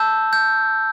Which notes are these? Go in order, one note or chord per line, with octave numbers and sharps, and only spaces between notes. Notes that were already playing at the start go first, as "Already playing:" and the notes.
Already playing: A5 E6 G6
G6